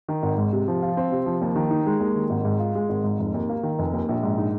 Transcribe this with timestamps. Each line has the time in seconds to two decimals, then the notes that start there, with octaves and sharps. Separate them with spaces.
0.08 D#3
0.23 G#1
0.38 G#2
0.53 C3
0.68 F3
0.82 F4
0.97 C4
1.12 C3
1.26 F3
1.42 D#2
1.56 D#3
1.71 D#4
1.86 G#3
2.00 D#2
2.16 D#3
2.30 G#1
2.45 G#2
2.59 F4
2.75 G#3
2.89 G#1
3.04 G#2
3.19 F1
3.34 D#2
3.49 A#3
3.63 D#3
3.79 F1
3.93 D#2
4.09 A#1
4.23 G#2
4.38 D#4